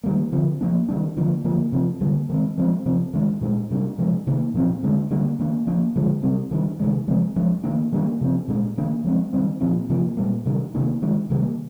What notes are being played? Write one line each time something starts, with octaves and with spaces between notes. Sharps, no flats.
D#3 G3 A#3
D3 F3 C4
F3 A#3 D4
D#3 G3 D4
D3 F3 A#3 D4
D3 F3 A#3
C3 F3 C4
D3 G3 A#3
D#3 G#3 C4
F3 G#3 C4
C3 F3 C4
D#3 G#3 D4
A#2 G#3 D4
C3 G3 A#3 D4
C3 F3 G#3 D4
C3 D#3 A#3
A#2 F3 C4
D3 G#3 D4
D3 G3 A#3 D4
D#3 A#3 D4
F3 A#3 D4
D3 F3 G#3
C3 G3 C4
D#3 G3 D4
C3 D#3 G#3
C3 F3 G#3 C4
F3 G#3 D4
D#3 A#3 D4
D#3 G3 A#3 D4
C3 F3 C4
A#2 G#3 D4
D#3 A#3 D4
F3 G#3 C4
D#3 G3 C4
A#2 F3 C4
C3 F3 A#3
A#2 G3 A#3
C3 D#3 G3 D4
C3 D#3 A#3 D4
D#3 G#3 D4
C3 D#3 G3 A#3